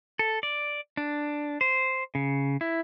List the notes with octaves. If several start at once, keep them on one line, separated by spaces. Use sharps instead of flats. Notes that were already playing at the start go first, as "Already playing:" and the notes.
A4
D5
D4
C5
C#3
E4